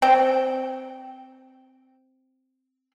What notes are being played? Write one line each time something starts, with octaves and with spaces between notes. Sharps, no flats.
C4 G5